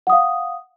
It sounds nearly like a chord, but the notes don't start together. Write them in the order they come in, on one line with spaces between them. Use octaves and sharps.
F#5 D#6 F5